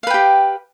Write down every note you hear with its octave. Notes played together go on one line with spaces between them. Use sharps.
G4 B4 F5 G5